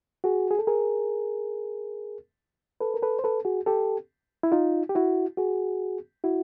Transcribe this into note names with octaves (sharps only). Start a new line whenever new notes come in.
F#4 G#4
G#4
A4
G#4 A#4
A4 B4
A#4
A4 B4
C5
A4 B4
F#4 G#4
G4 A4
E4
D#4 F4
G4
E4 F#4
F#4 G#4
E4 F#4